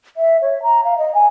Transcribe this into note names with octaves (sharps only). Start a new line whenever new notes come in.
E5
C#5
A#5
F5
D#5
G#5